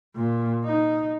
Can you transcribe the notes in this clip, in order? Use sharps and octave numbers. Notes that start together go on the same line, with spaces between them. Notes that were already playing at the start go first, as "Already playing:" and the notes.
A#2
D#4